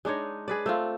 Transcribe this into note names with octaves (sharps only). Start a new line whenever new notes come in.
G#3 D4 D#4 C#5
G#4 B4 D5
A3 C4 F4